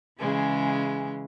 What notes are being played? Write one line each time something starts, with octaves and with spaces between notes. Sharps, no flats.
C#3 E3 G#3